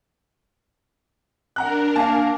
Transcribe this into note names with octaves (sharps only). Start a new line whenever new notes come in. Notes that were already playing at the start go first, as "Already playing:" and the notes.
D4 A#4 F#5 A#5 F#6
A#3 F5 G#5 A5